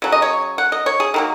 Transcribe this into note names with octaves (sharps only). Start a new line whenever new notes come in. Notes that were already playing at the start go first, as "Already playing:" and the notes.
C#3 F#3
D#5
C#5
F#5
D#5
C#5
G#4
D#3 F#3 A#3